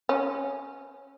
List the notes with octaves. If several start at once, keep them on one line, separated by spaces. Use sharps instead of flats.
C#4